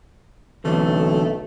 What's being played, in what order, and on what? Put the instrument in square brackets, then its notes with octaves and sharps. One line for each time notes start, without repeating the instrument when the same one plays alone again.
[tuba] B1 [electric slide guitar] D3 E3 C4 [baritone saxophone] A3